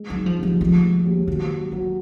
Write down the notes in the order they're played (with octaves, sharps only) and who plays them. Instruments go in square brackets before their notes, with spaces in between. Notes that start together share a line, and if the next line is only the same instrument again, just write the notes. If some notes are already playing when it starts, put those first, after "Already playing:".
Already playing: [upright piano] G#3
[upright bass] F#3
[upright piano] D#4
[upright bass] F3
[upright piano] C2 [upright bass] F3
[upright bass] F3 [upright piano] G#3
[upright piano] G#3
D#2
[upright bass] D#3 [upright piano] F#3
[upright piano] F#3
[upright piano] F#3 [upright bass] A#3